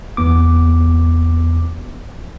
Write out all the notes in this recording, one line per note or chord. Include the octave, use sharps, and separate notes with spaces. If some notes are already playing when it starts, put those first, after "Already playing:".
E2 B3 D6